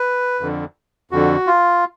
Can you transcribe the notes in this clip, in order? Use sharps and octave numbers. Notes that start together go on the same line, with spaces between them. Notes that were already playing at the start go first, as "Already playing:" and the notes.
Already playing: B4
F2 D3
F2 D3 F#4
F4